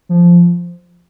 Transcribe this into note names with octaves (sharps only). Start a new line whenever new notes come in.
F3